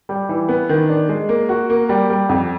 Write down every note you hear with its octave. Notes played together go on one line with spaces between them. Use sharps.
G3
E3
B3
D#3
D4
G#3
A#3
F#4
A#3
G3
G3
F2